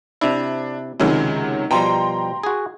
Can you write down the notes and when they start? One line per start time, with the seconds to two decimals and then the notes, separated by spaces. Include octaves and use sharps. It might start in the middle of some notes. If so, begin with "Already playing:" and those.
0.21 C3 D4 E4
1.00 C#2 C3 D#3 F#3 G#3
1.71 B2 F3 G3 G5 A#5 C6
2.43 F#4 G#4